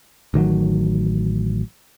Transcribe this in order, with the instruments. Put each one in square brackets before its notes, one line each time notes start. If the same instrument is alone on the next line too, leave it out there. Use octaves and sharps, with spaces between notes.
[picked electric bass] A1 D#3 E3 F#3